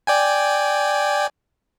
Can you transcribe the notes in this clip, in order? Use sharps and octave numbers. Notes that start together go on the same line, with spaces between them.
D5 G5 G#5